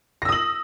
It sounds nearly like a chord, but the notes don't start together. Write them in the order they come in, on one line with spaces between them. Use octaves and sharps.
A#6 E6 D#6 F#7